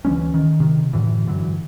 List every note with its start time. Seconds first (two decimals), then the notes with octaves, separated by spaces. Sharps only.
0.05 D2 E3 G#3 C#4
0.34 D#3
0.60 C3 D#3
0.93 F#2 A2 D3 E3
1.27 G2 D3 E3 F#3